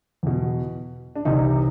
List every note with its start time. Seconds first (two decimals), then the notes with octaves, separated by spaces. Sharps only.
0.23 E2 B2
1.15 D4
1.25 C2 C3 E3 D#4